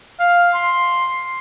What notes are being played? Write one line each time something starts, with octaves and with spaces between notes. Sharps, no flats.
F5
C6